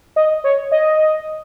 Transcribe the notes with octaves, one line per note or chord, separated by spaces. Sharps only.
D#5
C#5
D#5